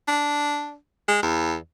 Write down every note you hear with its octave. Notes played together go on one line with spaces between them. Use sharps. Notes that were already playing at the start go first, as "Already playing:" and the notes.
D4
G#3
E2